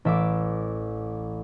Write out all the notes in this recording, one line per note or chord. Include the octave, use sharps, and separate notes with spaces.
A1 E5 D6